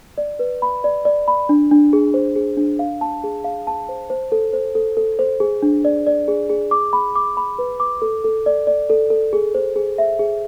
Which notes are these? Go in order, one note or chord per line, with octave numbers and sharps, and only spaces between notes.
D5
B4
B5
D5
D5
B5
D4
D4
G#4
C5
G#4
D4
F5
A5
G#4
F5
A5
C5
C5
A4
C5
A4
A4
C5
G#4
D4
D5
D5
G#4
G#4
D6
B5
D6
B5
B4
D6
A4
A4
D5
D5
A4
A4
G#4
C5
G#4
E5
G#4